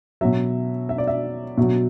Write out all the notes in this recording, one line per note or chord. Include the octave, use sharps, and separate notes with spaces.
B2 F#3 E5
E5
D5
E5
B2 F#3 E5